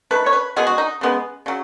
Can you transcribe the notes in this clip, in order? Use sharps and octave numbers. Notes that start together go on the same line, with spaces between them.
D#3 A3 B4
C#5
B4
B2 G#3 B3 G#4
F#4
D#4
C#3 G#3 B3
C#3 F#3